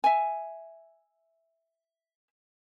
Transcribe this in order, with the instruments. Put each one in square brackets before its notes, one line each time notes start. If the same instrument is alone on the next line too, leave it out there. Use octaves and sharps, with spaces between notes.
[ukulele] E5 G#5